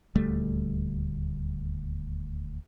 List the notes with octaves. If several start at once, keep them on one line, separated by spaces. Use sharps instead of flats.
D#1 D2 G3 A3